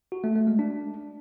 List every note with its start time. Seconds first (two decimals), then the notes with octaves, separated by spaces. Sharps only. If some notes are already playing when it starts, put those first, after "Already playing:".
0.12 F#4
0.24 A3
0.35 A3
0.47 G#3
0.59 D4